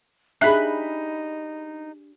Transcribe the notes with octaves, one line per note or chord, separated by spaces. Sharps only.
D4 D#4 G4 G#4 E5 B5 F#6